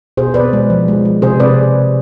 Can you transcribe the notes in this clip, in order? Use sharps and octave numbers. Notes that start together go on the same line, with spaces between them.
B2 G#4 C5
B2 B4 D5
G#3
F3
G#3
G#3
C3 G#4 C5
C3 B4 D5